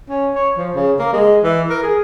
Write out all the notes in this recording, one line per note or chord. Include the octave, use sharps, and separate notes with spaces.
C#4
C#5
F3
C#3
A#3
G#3
E3
A#4
G#4